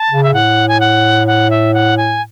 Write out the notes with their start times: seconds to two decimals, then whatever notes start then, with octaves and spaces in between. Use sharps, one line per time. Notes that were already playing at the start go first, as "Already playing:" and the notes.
Already playing: A5
0.10 C#3
0.23 E5
0.33 A2 F#5
0.68 G#5
0.80 F#5
1.27 F#5
1.50 E5
1.74 F#5
1.97 G#5